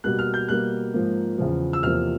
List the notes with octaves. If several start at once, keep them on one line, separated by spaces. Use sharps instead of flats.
B2 G3 A#3 F#6
F6
G6
B2 G3 A#3 F#6
G#2 F3 A#3
E2 C#3 F3
E6
E2 C3 F3 A#3 F6